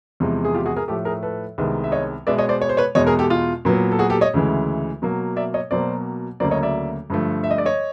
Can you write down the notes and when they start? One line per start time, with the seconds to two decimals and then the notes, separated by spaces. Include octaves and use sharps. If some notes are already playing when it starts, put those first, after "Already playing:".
0.20 E2 C3 F3 G#3
0.45 G#4
0.54 F4 G4
0.66 F#4 G#4
0.76 G#4 A#4
0.88 A2 F3 A3 G4 A4
1.05 G#4 A#4
1.23 A4 B4
1.58 C2 C3 D#3 G#3 B3
1.84 E5
1.92 C#5 D#5
2.27 B2 G#3 B3 D5 E5
2.38 C#5 D#5
2.49 C5 D5
2.62 C#5
2.69 C5
2.77 B4 C#5
2.95 E2 B2 G#3 C#5 D#5
3.07 G#4 A#4
3.19 G4 A4
3.30 F4
3.65 A#2 F#3 B3
3.91 A4
3.99 F#4 G#4
4.10 G4 A4
4.21 C#5 D#5
4.34 D2 C#3 E3 G#3
5.02 B2 F#3 A#3
5.36 D5 E5
5.54 C#5 D#5
5.71 B2 F#3 A#3 C5 D5
6.40 D2 C#3 F#3 A#3 C5 D5
6.51 C#5 D#5
6.63 D5 E5
7.10 G2 D3 F3 A3
7.44 E5
7.51 D#5
7.58 D5
7.66 C#5 D#5